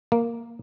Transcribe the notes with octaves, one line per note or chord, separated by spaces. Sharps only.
A#3